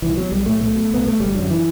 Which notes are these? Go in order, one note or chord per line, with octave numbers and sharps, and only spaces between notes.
C2 E3
B2 F#3
B1 G3
A2 A3
B1 A3
B2
C2 B3
B2 A3
G1 G3
F#2 D3 F#3
E3